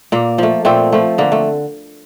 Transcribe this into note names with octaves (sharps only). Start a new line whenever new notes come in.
A#2 A#3
F3 A3
A#2 A3 C4
F3 A3
D3 A#3
A3